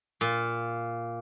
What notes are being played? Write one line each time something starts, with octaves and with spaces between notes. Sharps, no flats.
A#2